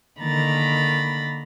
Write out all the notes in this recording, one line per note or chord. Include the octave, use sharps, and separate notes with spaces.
D3 D#3 A#3 A#5 B5 A6